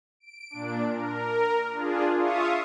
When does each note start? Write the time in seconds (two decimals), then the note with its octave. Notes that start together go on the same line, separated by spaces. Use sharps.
0.20 D7
0.50 A#2 D4
0.88 A#4
1.72 D4 F4 G#4
2.18 F4 E5 F5 C#6 D#6